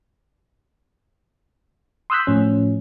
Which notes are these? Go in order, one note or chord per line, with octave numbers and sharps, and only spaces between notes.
C6 D#6 E6 F#6 G6 B6
A2 F3 C#4